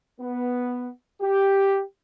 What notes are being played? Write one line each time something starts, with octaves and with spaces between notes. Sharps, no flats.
B3
G4